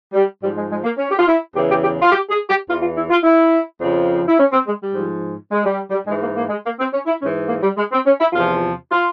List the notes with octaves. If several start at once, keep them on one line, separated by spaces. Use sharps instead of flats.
G3
G#2 F3 G3
G#3
G#3
A#3
C#4
G4
F4
E4
E2 C#3 E3 G4
G4
G4
F4
G4
G#4
G4
E2 E3 F4
F4
E4
F4
E4
F2 C#3 F3
E4
C#4
C4
G#3
G3
G#2 F3
G#3
G3
G3
G#2 E3 G#3
A#3
A#3
G#3
A#3
C4
C#4
E4
G#2 E3 C#4
A#3
G3
G#3
C4
C#4
E4
E2 C3 F3 F4
F4